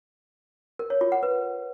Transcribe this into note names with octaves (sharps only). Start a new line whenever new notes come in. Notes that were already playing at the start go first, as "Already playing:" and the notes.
A#4
C#5
F4
F#5
B4